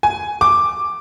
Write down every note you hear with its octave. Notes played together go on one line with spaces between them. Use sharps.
G#5
D6